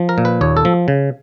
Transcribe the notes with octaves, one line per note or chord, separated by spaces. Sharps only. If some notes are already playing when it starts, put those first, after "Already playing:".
Already playing: F3
A#4
A#2
B4
D#2 C#5
A4
F3
C#3